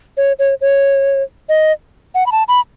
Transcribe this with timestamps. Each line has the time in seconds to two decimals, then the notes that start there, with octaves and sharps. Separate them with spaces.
0.17 C#5
0.39 C#5
0.61 C#5
1.49 D#5
2.15 F#5
2.26 B5
2.32 A5
2.48 B5